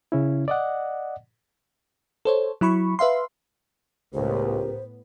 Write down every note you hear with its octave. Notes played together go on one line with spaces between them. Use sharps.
C#3 C#4 E4
D5 D#5 F#5
A4 C5 C#5
F#3 E4 B5 C#6
B4 E5 F5 C6
C#2 A2 B3 G4 A#4 C5